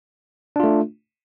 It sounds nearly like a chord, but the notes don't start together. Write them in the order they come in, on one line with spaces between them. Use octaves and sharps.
D4 F4 A3